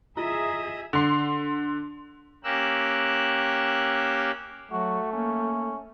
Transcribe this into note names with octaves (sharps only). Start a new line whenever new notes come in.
E4 F4 G#4 D#5 E5 A#5 D#6
D3 C6
A#3 C#4 G4 A#4 E6 F#6
F#3 A3 F#4
A#3 C#4